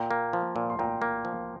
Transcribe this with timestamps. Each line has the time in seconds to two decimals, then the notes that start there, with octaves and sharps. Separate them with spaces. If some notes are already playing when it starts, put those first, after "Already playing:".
Already playing: A#2 G5 A#5
0.11 A#3
0.33 F3
0.56 A#2
0.70 C6
0.79 A#2 G5 A#5
1.02 A#3
1.25 F3